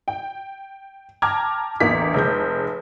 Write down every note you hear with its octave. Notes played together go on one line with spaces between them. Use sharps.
G5
G5 A5 A#5 D6 F6 G#6
A1 E2 D3 A#3 B6
F1 G#3 G6